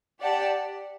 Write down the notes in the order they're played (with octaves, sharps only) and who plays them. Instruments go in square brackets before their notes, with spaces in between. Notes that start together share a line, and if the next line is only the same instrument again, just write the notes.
[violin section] G4 D5 F#5 A5